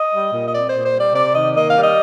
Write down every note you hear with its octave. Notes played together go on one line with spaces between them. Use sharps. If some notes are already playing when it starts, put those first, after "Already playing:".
Already playing: D#5
G3
A#2
D#5
C4 D5
C5
A#2
C5
G3
D5
C3 D5
D#3 D#5
A#3 D#5
F5
G3
D#5